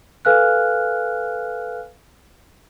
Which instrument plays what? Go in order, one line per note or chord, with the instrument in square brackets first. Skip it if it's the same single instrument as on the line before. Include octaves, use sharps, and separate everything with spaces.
[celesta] A4 B4 F5 G#5 F6 F#6